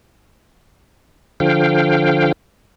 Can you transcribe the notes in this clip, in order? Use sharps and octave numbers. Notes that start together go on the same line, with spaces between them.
D3 F3 F5 G5